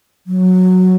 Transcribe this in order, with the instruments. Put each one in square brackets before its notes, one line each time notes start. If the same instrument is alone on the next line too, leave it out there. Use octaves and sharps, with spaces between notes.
[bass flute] F#3